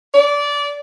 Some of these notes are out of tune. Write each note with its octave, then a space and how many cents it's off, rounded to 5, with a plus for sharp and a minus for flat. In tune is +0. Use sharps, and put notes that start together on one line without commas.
D5 -20